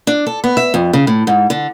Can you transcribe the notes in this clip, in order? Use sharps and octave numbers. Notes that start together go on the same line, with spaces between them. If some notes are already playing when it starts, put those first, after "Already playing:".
D4
A4
B3
E5
F2
C#3
A2
G#2
D3